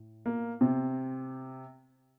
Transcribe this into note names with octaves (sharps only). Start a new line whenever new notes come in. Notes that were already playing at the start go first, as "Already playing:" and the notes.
Already playing: A2
A#3
C3 C4